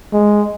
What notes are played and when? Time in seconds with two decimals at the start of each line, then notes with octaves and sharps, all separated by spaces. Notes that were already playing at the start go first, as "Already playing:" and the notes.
0.13 G#3